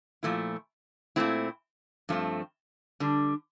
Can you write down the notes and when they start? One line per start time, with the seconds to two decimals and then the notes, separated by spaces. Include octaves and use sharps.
0.23 A#2 F3 A3 E4
1.16 A#2 A3 C4 E4
2.09 G2 F3 A3 C4
3.00 D3 G3 D4